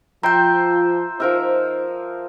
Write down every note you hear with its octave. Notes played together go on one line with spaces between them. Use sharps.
F3 F4 C5 E5 G5 A#5 G6
F3 D#4 A#4 C5 E5